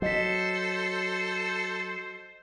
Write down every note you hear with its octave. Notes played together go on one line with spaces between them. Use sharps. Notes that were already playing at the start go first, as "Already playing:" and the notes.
F#3 A4 C5 D#5 B6